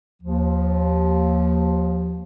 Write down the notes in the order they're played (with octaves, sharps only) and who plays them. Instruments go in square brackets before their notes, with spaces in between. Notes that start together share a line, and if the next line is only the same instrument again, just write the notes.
[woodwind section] D#2 F3